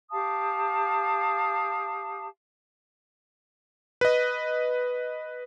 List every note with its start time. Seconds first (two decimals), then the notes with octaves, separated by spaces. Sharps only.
0.11 G4 F5 A5 D#6
4.01 B4 D#5